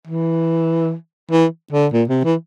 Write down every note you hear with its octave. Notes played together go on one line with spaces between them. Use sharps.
E3
E3
D3
A#2
C3
E3